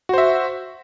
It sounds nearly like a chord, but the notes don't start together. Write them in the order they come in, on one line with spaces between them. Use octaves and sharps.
F#4 C5 E5